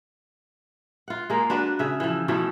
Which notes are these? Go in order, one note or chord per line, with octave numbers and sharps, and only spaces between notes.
F4 F#5
G#3 A#3
D4 F#4 B4
C#3 E5
E3 F3
B2 E3 F3 A3